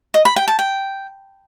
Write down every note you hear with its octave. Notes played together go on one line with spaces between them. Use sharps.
D#5
B5
G5
A5
G5